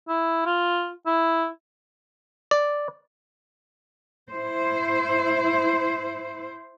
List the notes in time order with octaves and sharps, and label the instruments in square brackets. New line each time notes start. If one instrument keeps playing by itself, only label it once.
[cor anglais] E4
F4
E4
[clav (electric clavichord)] D5
[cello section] E4 C5